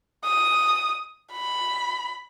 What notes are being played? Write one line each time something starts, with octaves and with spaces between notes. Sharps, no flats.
D#6
B5